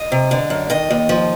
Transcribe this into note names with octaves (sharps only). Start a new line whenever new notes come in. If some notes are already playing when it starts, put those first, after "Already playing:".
Already playing: D#5
C3
D3
F#2
D#3 D#5
D#2
F3